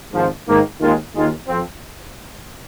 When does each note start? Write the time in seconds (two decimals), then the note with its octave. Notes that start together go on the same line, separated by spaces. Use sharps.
0.13 G#1 G#2 F3
0.46 G#2 D#3 A#3
0.80 D#2 D#3 G#3 F4
1.14 D#2 D#3 G#3 F4
1.47 F2 F3 C4